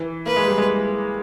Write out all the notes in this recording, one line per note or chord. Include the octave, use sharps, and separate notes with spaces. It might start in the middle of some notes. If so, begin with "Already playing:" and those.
Already playing: E3
A#3 B4
G#3
G3
G#3